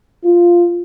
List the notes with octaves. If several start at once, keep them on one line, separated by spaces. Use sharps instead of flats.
F4